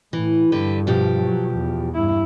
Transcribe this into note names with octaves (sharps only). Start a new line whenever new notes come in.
A2 E3
G2 D3 G4 B4
B2 F3 G4
F#3
E2
G2 E4